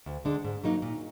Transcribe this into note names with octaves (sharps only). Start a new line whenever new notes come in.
D2
D3 G#3 D4
G#2
F#3 A#3 D#4
A#2